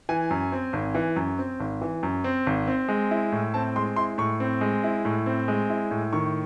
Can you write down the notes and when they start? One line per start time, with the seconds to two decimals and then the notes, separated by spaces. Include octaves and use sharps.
0.09 E3 G#5
0.30 F#2
0.52 C4
0.73 G#1
0.95 E3
1.16 F#2
1.39 C4
1.60 G#1
1.81 E3
2.03 F#2
2.24 C4
2.46 G#1
2.67 C4
2.88 G#3
3.11 E4
3.32 A2
3.54 C4 A5
3.76 G#3 C6
3.96 E4 C6
4.18 A2 C#6
4.40 C4
4.61 G#3
4.84 E4
5.05 A2
5.26 C4
5.48 G#3
5.70 E4
5.91 A2
6.13 D#3 C#6